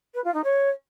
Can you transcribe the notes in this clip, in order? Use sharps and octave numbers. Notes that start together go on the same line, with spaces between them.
B4
F4
D#4
C#5